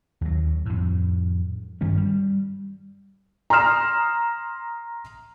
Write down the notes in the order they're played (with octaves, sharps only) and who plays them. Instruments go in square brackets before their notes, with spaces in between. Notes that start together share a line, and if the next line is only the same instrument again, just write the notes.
[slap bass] D#2 F#3
F2 A2
G2 D#3 G3 C#4
G3
[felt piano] A#5 C6 D#6 F6 E7